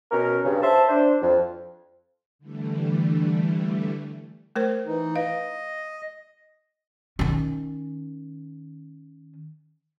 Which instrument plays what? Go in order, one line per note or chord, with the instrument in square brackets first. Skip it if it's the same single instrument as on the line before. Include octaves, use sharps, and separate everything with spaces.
[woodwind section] B2 C#4 A#4
G2 C#3
C5 E5 A5
D4 C5
F2
[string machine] D3 E3 G3 A3
[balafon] A3 A#4 C5
[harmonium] E3 D#4
[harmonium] D#5 [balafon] F5
[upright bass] D#3 C#4